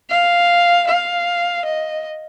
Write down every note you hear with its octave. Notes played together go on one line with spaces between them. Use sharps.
F5
F5
D#5